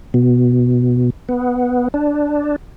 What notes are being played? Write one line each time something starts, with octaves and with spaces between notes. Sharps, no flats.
B2
B3
D4